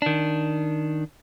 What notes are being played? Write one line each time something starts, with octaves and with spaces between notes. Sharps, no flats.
D#3 D4